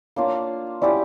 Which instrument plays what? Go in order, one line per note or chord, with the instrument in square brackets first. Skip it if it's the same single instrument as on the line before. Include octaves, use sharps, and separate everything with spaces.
[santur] A#3 D4 F4 [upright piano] C#5
[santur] C#4 E4 G4 [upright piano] D5